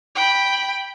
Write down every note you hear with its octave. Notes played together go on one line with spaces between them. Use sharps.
G5 B5